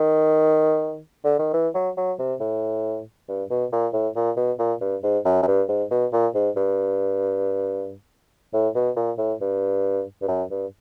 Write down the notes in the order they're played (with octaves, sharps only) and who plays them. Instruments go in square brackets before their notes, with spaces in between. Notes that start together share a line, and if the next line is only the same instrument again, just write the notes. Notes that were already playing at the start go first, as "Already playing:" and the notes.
Already playing: [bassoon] D#3
D3
D#3
E3
F#3
F#3
C3
A2
G2
B2
A#2
A2
A#2
B2
A#2
G2
G#2
F#2
F#2
G2
G#2
B2
A#2
G#2
G2
A2
B2
A#2
A2
G2
G2
F#2
G2